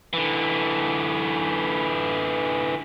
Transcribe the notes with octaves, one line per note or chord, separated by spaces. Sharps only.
D3 E3